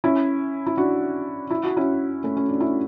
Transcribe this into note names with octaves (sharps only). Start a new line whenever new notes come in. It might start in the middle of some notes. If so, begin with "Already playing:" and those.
C#4 E4
E4
D4 F#4
E4
F#4
C#4 E4
A3 C#4
C#4
D4
C#4 E4